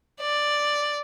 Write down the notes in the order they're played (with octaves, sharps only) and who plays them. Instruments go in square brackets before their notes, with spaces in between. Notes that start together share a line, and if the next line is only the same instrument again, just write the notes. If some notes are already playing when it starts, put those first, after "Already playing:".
[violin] D5